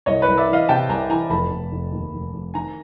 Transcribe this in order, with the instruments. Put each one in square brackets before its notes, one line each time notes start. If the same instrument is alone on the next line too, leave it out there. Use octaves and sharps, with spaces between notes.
[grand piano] C2 [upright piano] C#5 D#5
[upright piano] B4 C#5
[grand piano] C2
[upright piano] D5 E5
[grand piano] E3 [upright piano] D#5 F5
[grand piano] C3 [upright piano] G5 A5
[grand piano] C2 [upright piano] G#5 A#5
[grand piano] E3 [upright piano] G#5 A#5
[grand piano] F1 [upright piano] A5 B5
[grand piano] F1
F1
D#2
F1
F1
[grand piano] D#3 [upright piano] G#5 A#5